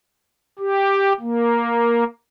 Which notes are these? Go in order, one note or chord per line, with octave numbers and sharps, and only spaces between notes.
G4
A#3